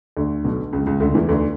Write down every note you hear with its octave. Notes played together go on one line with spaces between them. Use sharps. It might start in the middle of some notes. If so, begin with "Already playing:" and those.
D2 D3
B1 B2
C#2 C#3
C#2 C#3
D2 D3
E2 E3
D2 D3